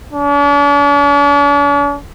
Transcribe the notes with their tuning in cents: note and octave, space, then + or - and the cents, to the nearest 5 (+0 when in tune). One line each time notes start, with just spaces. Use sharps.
D4 -45